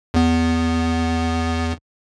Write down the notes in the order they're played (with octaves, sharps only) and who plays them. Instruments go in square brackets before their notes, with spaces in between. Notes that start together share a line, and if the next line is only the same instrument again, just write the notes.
[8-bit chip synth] E2 B3